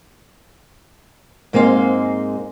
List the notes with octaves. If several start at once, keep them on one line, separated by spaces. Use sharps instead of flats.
G#2 G#3 A#3 C4 D#4 F5